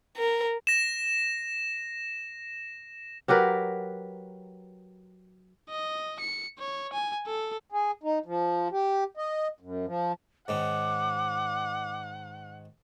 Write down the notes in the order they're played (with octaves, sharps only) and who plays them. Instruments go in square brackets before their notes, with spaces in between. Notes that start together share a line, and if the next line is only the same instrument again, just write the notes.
[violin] A#4
[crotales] A#6 E7
[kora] F#3 G4 A#4 B4
[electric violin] D#5
C#7
C#5
G#5
A4
[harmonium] G#4
D#4
F3
G4
D#5
F#2
F3
[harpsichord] G#2 D#3 C#4 [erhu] F#5 [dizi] D6